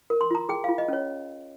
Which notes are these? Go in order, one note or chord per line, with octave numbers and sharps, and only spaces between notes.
A#4
C6
F4 A#5
G#4 G5
F5
F4
D#5
C#4 C#5